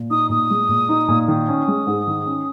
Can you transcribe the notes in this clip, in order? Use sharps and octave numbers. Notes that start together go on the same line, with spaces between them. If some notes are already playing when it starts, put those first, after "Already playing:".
Already playing: A#2
D#4 D#6
A#2 D#6
G#3
A#2
D#4
A#2
D#3 D#6
C#4
G#3
G#2
D#3
C#4